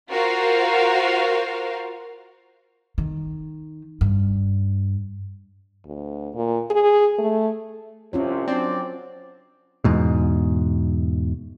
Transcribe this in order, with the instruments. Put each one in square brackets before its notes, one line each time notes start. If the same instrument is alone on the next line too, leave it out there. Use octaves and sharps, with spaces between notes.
[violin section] F4 F#4 A#4 C5 F5
[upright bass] D#3
G2
[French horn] D2
A#2
G#4
A3
[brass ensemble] C2 C3 [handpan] C#4 F4 C#5
[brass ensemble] F#3 D4 [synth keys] C4 [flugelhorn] D5
[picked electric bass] E2 G#2 B2